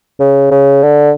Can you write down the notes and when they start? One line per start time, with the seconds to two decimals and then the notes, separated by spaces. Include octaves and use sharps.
0.20 C#3
0.51 C#3
0.83 D3